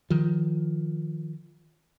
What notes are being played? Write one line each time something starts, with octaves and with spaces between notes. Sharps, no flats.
D#3 F3